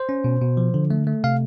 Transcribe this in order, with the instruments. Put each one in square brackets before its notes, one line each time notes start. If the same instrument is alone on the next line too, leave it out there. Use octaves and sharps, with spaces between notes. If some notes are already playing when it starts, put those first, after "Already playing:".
Already playing: [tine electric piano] C5
C#4
B2
B2
F3
D3
A3
A3
C3 F5